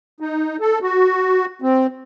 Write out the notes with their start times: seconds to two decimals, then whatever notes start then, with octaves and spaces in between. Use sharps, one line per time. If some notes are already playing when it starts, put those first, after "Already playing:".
0.20 D#4
0.60 A4
0.82 F#4
1.62 C4